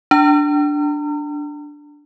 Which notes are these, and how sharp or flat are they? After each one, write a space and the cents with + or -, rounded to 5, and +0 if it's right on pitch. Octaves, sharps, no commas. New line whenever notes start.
D4 +0 A#5 -40